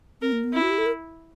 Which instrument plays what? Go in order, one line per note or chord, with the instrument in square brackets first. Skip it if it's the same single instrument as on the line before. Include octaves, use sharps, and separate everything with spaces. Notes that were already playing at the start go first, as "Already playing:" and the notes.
[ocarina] C4 [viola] A#4
[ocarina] A#3
B3
[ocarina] C4 [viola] E4
[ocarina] F#4
G4
A4
A#4